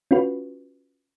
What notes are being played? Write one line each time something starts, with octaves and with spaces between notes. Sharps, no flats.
C#4 F4 F#4 B4